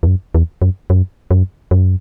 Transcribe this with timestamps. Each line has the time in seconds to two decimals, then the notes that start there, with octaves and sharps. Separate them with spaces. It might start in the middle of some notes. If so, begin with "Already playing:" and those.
0.03 E2
0.07 F#2
0.35 E2
0.62 F#2
0.90 F#2
1.31 F#2
1.71 F#2